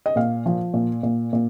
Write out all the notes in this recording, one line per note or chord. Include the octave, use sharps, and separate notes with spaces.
D#5
A#2 F5
F3
A#2
A#2
A#2